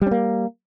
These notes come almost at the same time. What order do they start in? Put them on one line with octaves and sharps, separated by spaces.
G3 C#4 A#3